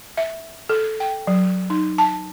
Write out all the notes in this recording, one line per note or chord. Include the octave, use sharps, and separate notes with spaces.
E5
A4
G5
F#3
D#4
A5